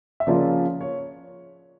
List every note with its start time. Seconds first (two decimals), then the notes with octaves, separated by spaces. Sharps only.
0.20 E5
0.27 C#3 F3 A#3 C#4 F4 D5
0.81 C#5